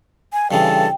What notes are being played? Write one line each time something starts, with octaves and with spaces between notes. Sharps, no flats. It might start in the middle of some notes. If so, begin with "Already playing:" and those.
G#5
G2 C#3 E3 A4 G5